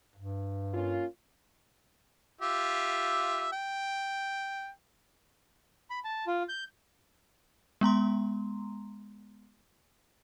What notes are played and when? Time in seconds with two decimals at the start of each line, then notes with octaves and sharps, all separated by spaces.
0.16 G2
0.74 A#3 C#4 F4
2.41 F4 G4 E5
3.52 G5
5.90 B5
6.04 A5
6.27 F4
6.49 G6
7.81 G#3 B3 A#5 C6